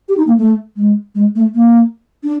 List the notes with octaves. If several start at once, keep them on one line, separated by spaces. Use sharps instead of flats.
G4
D#4
A#3
A3
G#3
G#3
A3
A#3
D4